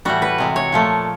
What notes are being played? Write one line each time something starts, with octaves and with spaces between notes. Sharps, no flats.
A2 E3 G3 F#4
B4
C3 E3 G#3
C#5
A#2 F3 A3